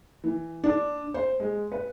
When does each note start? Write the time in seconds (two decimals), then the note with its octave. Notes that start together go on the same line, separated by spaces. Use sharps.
0.24 E3
0.64 D4
1.14 C5
1.40 G#3
1.72 B4